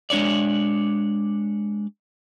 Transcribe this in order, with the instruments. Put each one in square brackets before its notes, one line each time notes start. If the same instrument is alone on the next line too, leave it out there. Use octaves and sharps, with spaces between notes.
[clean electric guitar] G#3 D4 C#5 D5